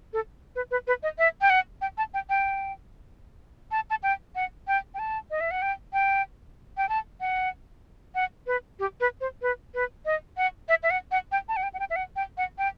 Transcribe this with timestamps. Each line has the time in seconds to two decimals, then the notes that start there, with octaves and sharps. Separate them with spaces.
0.13 A4
0.56 B4
0.71 B4
0.87 B4
1.03 D#5
1.18 E5
1.41 G5
1.50 F#5
1.81 G5
1.98 A5
2.14 G5
2.29 G5
3.71 A5
3.90 A5
4.03 G5
4.35 F#5
4.67 G5
4.94 G5
4.99 A5
5.31 D#5
5.41 E5
5.51 F#5
5.62 G5
5.93 G5
6.77 G5
6.89 A5
7.20 F#5
8.15 F#5
8.47 B4
8.79 G4
9.00 B4
9.21 C5
9.42 B4
9.74 B4
10.06 D#5
10.37 F#5
10.69 E5
10.83 E5
10.90 F#5
11.11 F#5
11.32 G5
11.49 A5
11.57 F#5
11.63 G5
11.74 F#5
11.80 G5
11.90 E5
11.96 F#5
12.16 G5
12.38 F#5
12.58 G5